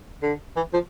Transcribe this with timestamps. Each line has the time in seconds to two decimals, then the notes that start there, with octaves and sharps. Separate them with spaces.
0.22 D3
0.56 E3
0.73 F3